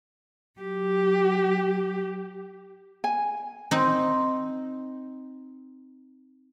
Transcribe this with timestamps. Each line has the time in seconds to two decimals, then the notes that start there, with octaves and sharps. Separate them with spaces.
0.60 F#3 G4
3.04 G#5
3.71 C4 D#4